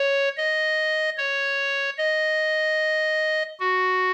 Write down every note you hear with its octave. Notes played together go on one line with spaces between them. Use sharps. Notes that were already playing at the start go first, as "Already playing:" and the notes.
Already playing: C#5
D#5
C#5
D#5
F#4